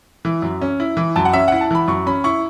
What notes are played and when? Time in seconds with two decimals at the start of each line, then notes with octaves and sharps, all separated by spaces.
0.25 E3
0.42 F#2
0.62 C#4
0.80 E4
0.97 E3
1.16 F#2 A5
1.25 F#5
1.33 C#4 E5
1.48 E4 F#5
1.61 A5
1.71 E3 B5
1.88 F#2 C#6
2.07 C#4 B5
2.24 E4 C#6